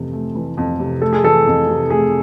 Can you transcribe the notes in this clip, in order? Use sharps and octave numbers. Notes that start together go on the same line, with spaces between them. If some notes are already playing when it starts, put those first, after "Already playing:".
Already playing: F2 C3 E3 A3
A3
E3
F2
C3
A3 A4
G#4
E3 A4
F2
C3
A3 G#4